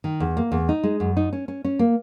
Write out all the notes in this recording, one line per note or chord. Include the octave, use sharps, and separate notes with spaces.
D#3
E2
A#3
E2
D#4
G#3
F#2
D#4
C#4
C#4
C#4
A#3